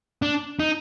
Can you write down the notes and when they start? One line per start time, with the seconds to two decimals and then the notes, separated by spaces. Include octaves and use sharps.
0.22 D4
0.60 D#4